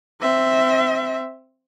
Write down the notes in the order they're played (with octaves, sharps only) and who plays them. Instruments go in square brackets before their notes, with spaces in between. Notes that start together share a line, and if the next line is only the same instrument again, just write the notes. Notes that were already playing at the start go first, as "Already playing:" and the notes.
[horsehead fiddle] C4 E5